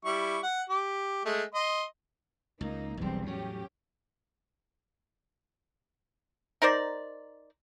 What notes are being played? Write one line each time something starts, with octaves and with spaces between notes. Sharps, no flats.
G3 E4 C#6
F#5
G4
G#3 A3
D#5 C6
C#2 A#3 D#4
E1 B1 E2 G3 C4
A2 F#3 C#4 G4
D#4 A#4 C5 D5